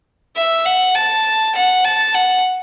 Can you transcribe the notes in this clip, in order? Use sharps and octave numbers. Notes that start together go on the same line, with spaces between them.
E5
F#5
A5
F#5
A5
F#5